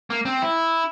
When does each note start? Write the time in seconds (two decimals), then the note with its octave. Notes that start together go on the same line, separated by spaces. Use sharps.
0.10 A#3
0.25 C4
0.42 E4